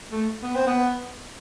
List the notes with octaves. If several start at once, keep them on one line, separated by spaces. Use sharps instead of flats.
A3
B3
C4
B3